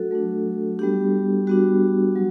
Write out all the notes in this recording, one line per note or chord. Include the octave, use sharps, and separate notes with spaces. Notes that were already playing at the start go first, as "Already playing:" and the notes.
Already playing: F#3 A3 D4 F#4 A4
F#3 A3 D4
G3 B3 D4 G4
G3 B3 D4 F#4
F#3